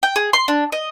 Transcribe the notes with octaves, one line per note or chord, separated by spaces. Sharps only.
G5
G#4
C6
D4
D#5